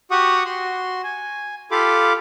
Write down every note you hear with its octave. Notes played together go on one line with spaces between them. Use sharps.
F#4 G4 F#5 C#6 D#6
F#4 C6
G#5
F4 G4 A4 F5 B5 D6